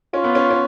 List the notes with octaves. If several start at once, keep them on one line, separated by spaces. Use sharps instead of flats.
C#4 F4
B3
C#4
C#4